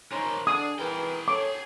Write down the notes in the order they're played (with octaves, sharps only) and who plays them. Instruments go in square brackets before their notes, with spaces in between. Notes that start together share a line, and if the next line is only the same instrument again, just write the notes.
[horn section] D#3 C#4 [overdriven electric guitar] A#4 C5
[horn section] D3 D4 [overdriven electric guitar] G#4 [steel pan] D#6
[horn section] E3 A#4 B4 [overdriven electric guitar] G#4 G5
[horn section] C#4 A4 C#5 [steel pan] D6